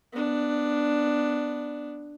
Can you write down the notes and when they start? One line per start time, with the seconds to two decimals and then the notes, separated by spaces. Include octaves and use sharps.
0.12 B3 D4